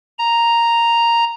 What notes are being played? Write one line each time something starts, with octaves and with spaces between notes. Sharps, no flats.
A#5